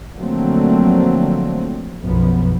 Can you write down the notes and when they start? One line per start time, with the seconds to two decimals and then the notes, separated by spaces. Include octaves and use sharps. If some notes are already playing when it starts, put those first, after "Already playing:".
0.15 D3 F3 F#3 A3 A#3 C4
2.03 B1 F#2 F3 B3